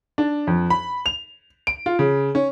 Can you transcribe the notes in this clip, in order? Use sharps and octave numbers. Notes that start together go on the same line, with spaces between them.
D4
F2
B5
F7
D7
F4
C#3
C#4